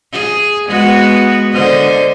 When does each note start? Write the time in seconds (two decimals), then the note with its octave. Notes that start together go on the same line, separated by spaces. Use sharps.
0.12 G#4
0.68 G#3 B3 F#4
1.52 D3 C5 D#5